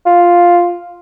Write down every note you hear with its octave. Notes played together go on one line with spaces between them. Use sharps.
F4